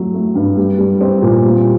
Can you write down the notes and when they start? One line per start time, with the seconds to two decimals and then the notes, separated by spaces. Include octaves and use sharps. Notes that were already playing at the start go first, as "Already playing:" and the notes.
Already playing: F#3 A3
0.14 A3
0.35 G2
0.57 G3
0.78 G3
1.01 C4
1.22 A#2
1.44 G3